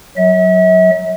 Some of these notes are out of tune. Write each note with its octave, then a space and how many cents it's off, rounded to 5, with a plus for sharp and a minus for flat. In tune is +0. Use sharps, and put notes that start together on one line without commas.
F#3 +0 E5 -40